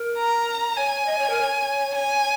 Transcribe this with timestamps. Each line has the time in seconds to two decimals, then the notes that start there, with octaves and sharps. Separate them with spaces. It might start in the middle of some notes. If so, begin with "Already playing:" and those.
Already playing: A#4
0.18 A#5
0.77 C#5 G#5
1.06 D#5
1.19 C#5
1.30 A#4
1.41 C#5
1.95 G#5